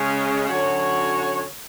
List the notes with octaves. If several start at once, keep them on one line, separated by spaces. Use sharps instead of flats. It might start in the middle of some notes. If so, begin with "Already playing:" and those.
Already playing: C#3 G#3 C#4
D3 F#3 C#4 F#4 C#5